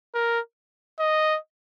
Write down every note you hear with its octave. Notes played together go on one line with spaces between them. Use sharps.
A#4
D#5